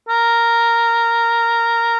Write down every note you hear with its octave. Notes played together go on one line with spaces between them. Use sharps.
A#4